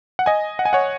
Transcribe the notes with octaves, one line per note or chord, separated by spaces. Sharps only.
F#5
D#5 G#5
F#5
G#5
C#5 F#5